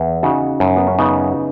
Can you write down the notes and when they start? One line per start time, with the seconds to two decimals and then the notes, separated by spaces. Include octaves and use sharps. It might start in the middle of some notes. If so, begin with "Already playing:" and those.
Already playing: E2
0.23 C#3 D#4 F#4
0.60 F#2
0.77 B3
0.87 C#4
0.99 C#3 B3 D#4